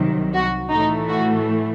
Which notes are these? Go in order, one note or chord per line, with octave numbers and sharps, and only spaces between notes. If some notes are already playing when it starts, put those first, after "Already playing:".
Already playing: C2 C3 D#3 F#3
F#4
A2 E3 A3 D#4
F#4